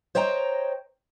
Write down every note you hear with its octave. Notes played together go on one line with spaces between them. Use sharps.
C5 C#5 D#5 G5 A#5